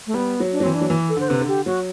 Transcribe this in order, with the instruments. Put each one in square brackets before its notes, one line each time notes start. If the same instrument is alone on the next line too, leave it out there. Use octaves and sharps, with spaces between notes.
[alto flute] A3
[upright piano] G3 [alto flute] B3
[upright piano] F#3
[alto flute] D4
[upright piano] F#3
[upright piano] E3 [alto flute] C4
[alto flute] D4
[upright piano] F#3
E3
[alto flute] A4
[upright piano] D3 [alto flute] C5
[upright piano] C3 [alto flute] B4
[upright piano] D3
[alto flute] G4
[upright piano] F#3 [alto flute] F#4